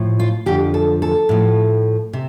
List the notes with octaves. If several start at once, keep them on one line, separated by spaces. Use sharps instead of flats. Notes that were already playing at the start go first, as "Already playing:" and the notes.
Already playing: A2 F3
F4
F2 D3 F3 G4
A4
A4
A2 F3
C3